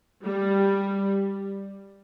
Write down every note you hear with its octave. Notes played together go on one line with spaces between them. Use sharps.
G3